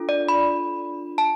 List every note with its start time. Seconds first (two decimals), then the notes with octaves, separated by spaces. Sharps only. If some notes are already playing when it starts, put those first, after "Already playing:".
Already playing: D4 F4 A4
0.09 D5
0.29 B5
1.18 A5